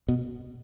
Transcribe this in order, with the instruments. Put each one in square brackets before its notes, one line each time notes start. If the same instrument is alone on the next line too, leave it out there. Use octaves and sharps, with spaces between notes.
[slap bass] B2